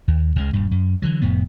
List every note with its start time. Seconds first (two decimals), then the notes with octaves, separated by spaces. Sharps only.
0.08 D#2
0.36 C#2 C#3 G#3
0.53 D#1 G2
0.71 F#2
1.02 D3 E3 F#3
1.22 F1 F2 A2 B3